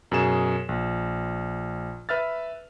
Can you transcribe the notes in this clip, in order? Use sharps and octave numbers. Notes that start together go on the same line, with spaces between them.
F#2 B2 G#4 E7
A#1
B4 E5 F6 A6